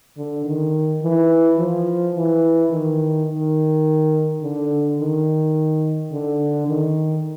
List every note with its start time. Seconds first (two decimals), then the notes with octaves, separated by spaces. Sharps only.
0.17 D3
0.45 D#3
1.02 E3
1.59 F3
2.15 E3
2.72 D#3
3.29 D#3
4.42 D3
4.98 D#3
6.12 D3
6.67 D#3